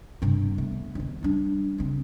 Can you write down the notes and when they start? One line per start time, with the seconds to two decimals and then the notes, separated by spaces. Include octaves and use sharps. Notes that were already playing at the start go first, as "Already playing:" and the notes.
0.22 G2 C3
0.58 A3 B3
0.95 D#1 D#2
1.23 G3 D4
1.78 C#3 C4